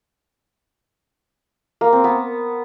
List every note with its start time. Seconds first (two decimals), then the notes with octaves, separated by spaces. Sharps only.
1.81 A#3
1.93 C4
2.04 B3